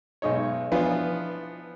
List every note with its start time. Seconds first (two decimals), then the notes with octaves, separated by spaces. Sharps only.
0.22 B1 G#3 D#4 C#5
0.71 E3 F3 B3 D4 F4